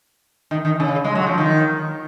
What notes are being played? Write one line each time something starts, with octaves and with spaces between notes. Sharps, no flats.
D#3
D#3
C#3
G#3
F#3
F3
D#3